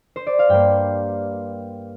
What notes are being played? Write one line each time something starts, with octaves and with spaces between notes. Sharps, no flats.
C5
D5
F5
G2 G3 A#3 G5